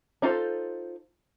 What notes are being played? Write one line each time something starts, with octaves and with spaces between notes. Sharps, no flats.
D4 D#4 F4 A4 C5